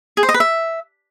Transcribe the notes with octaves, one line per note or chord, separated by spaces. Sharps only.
G#4
C5
D#5
B4
E5